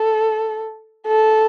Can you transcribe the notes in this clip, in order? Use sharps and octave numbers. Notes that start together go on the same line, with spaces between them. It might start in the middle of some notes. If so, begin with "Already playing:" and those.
Already playing: A4
A4